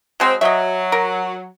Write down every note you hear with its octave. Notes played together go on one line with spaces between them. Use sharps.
F#3 G#3 C4
F#3 D#5 E5
A#4